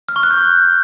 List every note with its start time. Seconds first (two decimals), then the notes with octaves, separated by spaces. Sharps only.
0.09 F6
0.16 C#6
0.23 F#6
0.31 G6